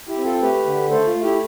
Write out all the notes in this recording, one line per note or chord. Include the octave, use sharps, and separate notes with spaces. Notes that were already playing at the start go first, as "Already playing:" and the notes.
E4 G4
C4
F4 A4
A3 G4 B4
D3
A3 A4 C5
F4
A3
E4 G4